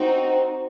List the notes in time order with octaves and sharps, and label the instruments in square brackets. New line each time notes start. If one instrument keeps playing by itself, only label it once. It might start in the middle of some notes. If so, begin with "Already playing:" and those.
Already playing: [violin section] C4 D#4 F#4